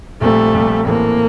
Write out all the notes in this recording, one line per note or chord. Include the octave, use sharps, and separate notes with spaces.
A#1 A#2 G3 A3 C4 G4
A#1 A#2 G3 C4 G4
A1 A2 E3 A3 A#3 C4